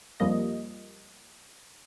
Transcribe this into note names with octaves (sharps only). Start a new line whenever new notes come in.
F2 F3 G3 A#3 D#5